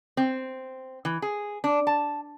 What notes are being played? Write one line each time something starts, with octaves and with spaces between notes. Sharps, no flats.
C4
E3
G#4
D4
A5